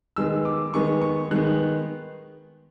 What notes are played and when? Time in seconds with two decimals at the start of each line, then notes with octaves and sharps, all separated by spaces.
0.16 D#3 G#3 B3 E6
0.45 D6
0.74 D#3 G#3 B3 C#6
1.02 C#6
1.31 D#3 G#3 B3 F#6